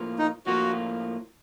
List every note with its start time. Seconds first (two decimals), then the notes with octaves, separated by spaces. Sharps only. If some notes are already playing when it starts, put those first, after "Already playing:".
Already playing: A2 F3 A#3 F4
0.18 D#4
0.46 A2 F3 A#3 F4 F#4